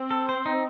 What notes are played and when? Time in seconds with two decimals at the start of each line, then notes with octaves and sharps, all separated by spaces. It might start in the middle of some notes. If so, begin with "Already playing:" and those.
Already playing: C4
0.11 A4
0.29 C5
0.46 D#4